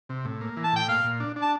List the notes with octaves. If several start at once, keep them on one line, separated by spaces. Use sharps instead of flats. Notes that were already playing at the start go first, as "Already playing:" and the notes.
C3
A2
A#3
E3
A5
A2 G5
A#2 F5
A#2
D4
D4
A5